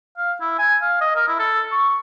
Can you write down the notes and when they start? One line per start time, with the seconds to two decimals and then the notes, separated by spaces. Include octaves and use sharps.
0.17 F5
0.41 E4
0.59 G#5
0.82 F5
1.01 D#5
1.16 A#4
1.28 E4
1.39 A4
1.71 C#6